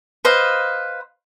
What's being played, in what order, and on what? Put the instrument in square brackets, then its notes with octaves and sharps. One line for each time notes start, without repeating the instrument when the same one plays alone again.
[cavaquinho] B4 C5 D#5 F5